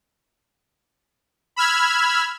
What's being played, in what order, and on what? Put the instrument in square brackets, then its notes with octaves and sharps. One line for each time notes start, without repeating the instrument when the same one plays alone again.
[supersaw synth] B5 E6 F6 G#6